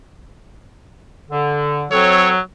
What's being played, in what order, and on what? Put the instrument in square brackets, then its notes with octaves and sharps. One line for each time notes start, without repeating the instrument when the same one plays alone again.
[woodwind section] D3
[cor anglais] F#3 [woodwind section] C4 A4 [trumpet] C#5